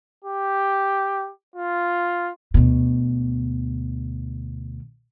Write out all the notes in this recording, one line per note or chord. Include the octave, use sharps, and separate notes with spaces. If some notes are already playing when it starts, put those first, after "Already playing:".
G4
F4
D2 B2